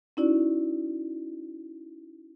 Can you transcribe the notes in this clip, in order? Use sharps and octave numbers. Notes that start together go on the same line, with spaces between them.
C#4 D#4 E4 F#4 D5